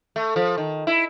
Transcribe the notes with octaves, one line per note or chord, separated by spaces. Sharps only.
A3
F3
D#3
E4